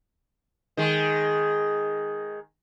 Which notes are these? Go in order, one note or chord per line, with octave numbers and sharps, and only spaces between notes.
D#3 G#3